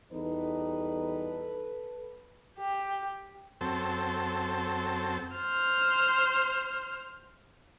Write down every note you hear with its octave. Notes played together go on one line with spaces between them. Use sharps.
E2 G3 D#4 A4 B4
G4
F#2 C4 A4
C5 F6